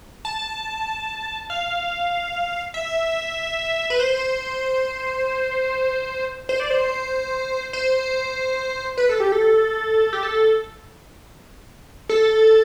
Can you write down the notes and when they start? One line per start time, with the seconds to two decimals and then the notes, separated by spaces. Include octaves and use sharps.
0.25 A5
1.50 F5
2.74 E5
3.90 B4
4.00 C5
6.49 C5
6.60 D5
6.71 C5
7.73 C5
8.97 B4
9.09 A4
9.20 G4
9.32 A4
10.13 G4
10.23 A4
12.09 A4